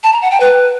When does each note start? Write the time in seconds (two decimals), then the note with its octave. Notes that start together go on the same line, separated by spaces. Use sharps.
0.03 A5
0.13 A#5
0.22 F#5
0.31 G5
0.40 B4